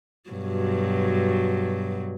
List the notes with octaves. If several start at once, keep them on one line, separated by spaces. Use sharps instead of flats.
G2 B2 F#3